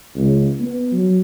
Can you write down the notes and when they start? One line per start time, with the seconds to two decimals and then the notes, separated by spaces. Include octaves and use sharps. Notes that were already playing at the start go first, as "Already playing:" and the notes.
0.15 C#2
0.60 B3
0.92 F#3